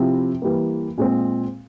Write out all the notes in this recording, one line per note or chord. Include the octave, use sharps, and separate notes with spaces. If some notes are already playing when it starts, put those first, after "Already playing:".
Already playing: C3 F3 C4 E4
E3 G3 A#3
A#2 G#3 C4